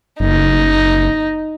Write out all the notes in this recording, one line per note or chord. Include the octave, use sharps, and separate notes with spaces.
F#1 D#4